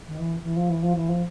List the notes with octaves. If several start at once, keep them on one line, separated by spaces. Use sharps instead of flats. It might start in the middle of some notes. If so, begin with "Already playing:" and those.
D#3
E3
E3
F3
E3
F3
E3
F3